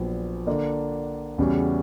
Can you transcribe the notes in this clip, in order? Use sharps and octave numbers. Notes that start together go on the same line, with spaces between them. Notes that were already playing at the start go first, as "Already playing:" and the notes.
Already playing: A#1 A#2 F#3 B3
D3 A#3 D4
E2 C#3 G3 C#4 F#4